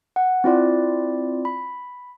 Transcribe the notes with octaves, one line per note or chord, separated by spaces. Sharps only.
F#5
C4 E4 F4 D5
B5